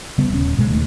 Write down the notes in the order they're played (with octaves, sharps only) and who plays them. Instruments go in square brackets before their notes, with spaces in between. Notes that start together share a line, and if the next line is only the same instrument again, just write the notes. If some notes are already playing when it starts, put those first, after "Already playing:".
[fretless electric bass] C#3 G3 B3
D#1 C#4
A1 B2 F#3 G#3
D1 D#2 D#3 A3